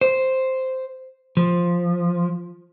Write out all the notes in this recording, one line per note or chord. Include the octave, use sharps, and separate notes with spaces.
C5
F3